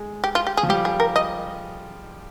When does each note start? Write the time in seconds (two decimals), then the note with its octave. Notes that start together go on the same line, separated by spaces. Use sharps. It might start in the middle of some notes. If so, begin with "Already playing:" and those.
Already playing: G#3
0.24 G4
0.35 F4
0.47 G4
0.57 G#4
0.63 F3
0.69 G3 G4
0.85 G#4
1.00 A#4
1.16 D#5